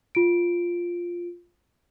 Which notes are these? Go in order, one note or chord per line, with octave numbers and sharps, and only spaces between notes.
F4 D7